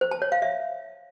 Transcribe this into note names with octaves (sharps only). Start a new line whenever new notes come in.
C5
A5
C#5
F5
E5